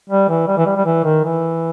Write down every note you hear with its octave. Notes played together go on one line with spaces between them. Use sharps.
G3
E3
G3
E3
G3
G3
E3
D#3
E3